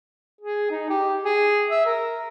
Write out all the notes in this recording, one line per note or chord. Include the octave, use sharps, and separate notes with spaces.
G#4
D#4
G4
G#4
E5
A#4